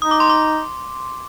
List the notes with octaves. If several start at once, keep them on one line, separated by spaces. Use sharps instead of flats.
D#4 D#6
D6
C6
D6